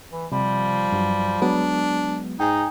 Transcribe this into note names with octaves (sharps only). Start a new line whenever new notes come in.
E3
C3 F3 G3
G2 F#3
F#3 G#3 B3 D4
G#2 D#4 G5 G#5